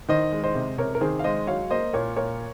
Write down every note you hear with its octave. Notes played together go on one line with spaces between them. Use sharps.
D#3 C5 D#5
G#3
C5 D#5
C3
C3 A#4 C#5
A#4
D#3 G#4 C5
F5
G#3 C5 D#5
F#3 C#5 F5
A#3 C5 D#5
A#2 A#4 C#5
A#2 A#4 C#5